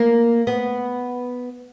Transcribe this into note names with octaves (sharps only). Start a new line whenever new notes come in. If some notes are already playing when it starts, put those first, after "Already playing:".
Already playing: A#3
B3